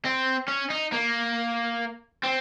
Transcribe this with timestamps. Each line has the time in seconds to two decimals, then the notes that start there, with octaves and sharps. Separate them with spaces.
0.05 C4
0.48 C#4
0.70 D#4
0.92 A#3
2.23 C4